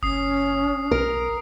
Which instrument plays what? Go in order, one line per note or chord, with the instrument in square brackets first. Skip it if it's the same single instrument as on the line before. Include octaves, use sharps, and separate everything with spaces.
[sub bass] F#1 [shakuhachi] C#4 [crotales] D#6 C7
[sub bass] B1 [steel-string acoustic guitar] A#4